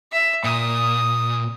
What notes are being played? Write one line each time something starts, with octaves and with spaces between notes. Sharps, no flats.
E5
A#2 D#6